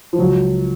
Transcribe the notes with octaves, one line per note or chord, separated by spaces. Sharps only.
F3
C#2 F#3